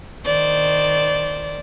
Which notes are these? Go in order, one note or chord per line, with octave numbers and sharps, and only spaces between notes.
D#3 C5 D5